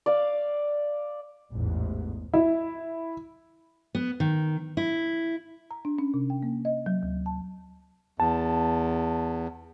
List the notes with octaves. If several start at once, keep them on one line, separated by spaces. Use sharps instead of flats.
D5 F5
A1 E2 G#2
E4
B3
D#3
E4
A#5
D4
C#4
C3
G5
A#3
D#5
F#3
D2
A5
E2 A5